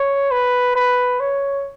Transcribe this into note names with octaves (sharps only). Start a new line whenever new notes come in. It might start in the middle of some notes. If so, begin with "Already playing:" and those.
Already playing: C#5
B4
B4
C#5